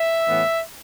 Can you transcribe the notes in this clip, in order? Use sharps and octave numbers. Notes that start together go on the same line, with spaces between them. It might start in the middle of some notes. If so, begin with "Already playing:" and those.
Already playing: E5
A2 E3 B3